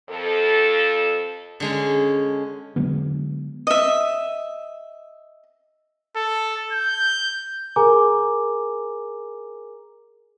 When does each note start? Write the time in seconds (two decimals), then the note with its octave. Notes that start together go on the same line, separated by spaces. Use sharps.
0.10 F2 A4
1.60 D3 G#3 C#4
2.76 D3 F#3 G#3 B3
3.67 D#5 E5
6.16 A4
6.73 G6
7.76 G#4 A#4 G#5 A#5 D6